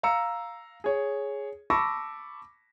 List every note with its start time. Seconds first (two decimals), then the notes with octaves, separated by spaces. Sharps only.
0.03 F5 A#5 E6 C#7
0.84 G#4 C#5
1.70 A5 B5 C#6 D6 E6 A#6